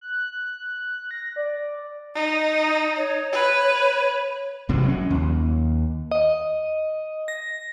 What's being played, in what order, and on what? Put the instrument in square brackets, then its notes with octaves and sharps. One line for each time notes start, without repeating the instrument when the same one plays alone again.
[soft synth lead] F#6
A#6
D5
[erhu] D#4
[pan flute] C#5
[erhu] B4
[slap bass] F#1 C3 E3 F#3
F#3 A#3 C#4
D#2
[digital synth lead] D#5
A#6